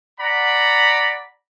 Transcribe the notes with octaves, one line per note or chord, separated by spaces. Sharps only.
D5 F#5 A#5 B5